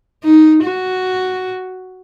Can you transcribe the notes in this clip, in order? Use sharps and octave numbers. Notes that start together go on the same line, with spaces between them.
D#4
F#4